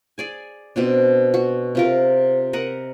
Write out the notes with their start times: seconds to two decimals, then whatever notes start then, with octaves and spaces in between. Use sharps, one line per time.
0.18 G#4 D5 G#5
0.76 B2 C4 D4
1.34 F#4
1.75 C3 F4 A#4
2.53 A#4 D#5 F#5